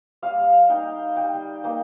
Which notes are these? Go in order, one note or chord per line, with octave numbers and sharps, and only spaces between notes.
G3 F5
D#4 G5
G3 G5
A#3 D#4 G5